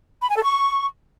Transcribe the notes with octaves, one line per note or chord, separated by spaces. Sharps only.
B5
G#5
A4
C#6